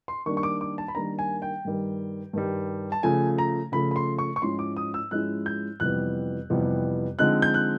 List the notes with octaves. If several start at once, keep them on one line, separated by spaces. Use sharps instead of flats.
C6
D#3 G3 A#3 D4 C#6
C#6
D6
D6
A5
B5
D#3 G3 A#3 D4 A#5
G#5
G5
G2 D#3 G3
G2 D#3 G3
A5
C#3 F3 A3 G#5
A#5
C#3 F3 A3 B5
B5
C6
C#6
C#6
G#2 F3 G#3 C#4 E4 C6
D6
D#6
E6
G#2 F3 G#3 C#4 E4 F#6
G6
F2 C3 E3 G3 B3 F#6
F2 C3 E3 G3 B3
D3 F3 G#3 C4 D#4 F#6
G6
F#6